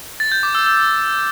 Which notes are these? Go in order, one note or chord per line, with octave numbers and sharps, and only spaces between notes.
A6
G6
D6
E6
E6